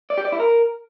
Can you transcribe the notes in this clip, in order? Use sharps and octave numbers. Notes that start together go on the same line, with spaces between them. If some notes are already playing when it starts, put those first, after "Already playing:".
D5
G4
D5
E4
A#4